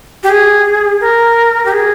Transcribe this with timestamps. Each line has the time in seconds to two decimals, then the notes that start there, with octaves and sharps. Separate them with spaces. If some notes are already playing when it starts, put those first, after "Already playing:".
0.23 G4
0.30 G#4
1.01 A#4
1.65 G4
1.72 G#4